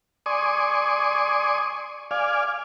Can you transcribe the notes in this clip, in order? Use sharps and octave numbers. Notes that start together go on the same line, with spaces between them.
D5 G#5 C6 C#6 D#6
D5 F5 G#5